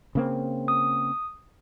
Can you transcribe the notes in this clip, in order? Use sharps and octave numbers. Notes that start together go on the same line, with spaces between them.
C#3 A#3 C4
D#6